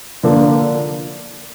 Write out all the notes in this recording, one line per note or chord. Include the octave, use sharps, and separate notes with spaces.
D3 F3 A#3 D4